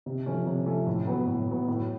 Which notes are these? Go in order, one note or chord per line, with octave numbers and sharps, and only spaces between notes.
C3
F3 A3 C#4
C3
F3 A3 C#4
A2
F#3 B3
A2
F#3 B3
A2